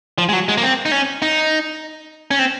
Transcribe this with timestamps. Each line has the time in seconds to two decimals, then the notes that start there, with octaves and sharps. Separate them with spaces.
0.18 F3
0.29 G#3
0.33 F#3
0.48 G#3
0.57 A#3
0.63 C4
0.86 D#4
0.92 C#4
1.22 D#4
2.31 C#4
2.39 C4